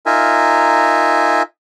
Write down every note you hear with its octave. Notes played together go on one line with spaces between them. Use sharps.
D#4 F4 A#4 E5 G#5